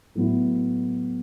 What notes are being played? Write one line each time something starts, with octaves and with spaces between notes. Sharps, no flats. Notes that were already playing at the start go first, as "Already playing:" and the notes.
A2 F#3 B3 E4